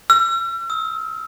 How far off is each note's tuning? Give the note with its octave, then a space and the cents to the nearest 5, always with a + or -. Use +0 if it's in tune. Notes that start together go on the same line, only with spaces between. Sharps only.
E6 +45
E6 -35